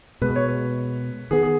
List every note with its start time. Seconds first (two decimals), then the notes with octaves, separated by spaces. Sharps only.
0.22 B2 G#3 B3 B4
0.36 C#5
0.49 B4
1.31 D#3 B3 G#4
1.43 G#4